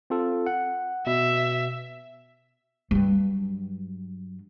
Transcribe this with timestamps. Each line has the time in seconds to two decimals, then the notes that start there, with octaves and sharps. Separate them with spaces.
0.10 C4 F4 A4
0.46 F#5
1.07 B2 E5
2.91 G2 F#3